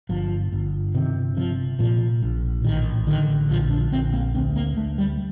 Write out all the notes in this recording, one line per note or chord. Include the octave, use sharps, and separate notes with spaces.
G1 F3
G1
C3 D#3
C3 F3
A#2 F3
A#1
A1 D#3
D3 D#3
A#1 F3
D4
A#1 C4
A#3
D2 C4
A#3
D2 A3
G3